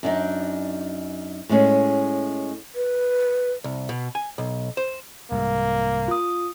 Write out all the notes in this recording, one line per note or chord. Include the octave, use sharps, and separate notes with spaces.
F#2 D4 D#4
A2 G#3 C#4
B4
C2
B2
G#5
B1
C5
C2 G#2 A#3
F4 D#6